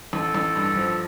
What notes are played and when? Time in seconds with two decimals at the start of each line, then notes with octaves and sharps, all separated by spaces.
0.13 A1 A4
0.35 A1
0.56 G2
0.76 F3